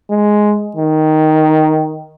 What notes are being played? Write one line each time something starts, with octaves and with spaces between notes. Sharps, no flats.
G#3
D#3